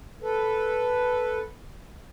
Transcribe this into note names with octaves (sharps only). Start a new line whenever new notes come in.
A4 B4